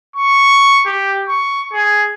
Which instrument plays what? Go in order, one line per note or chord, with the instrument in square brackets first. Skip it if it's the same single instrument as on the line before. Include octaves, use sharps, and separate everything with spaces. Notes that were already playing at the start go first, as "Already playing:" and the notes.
[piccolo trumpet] C#6
G4
C#6
G#4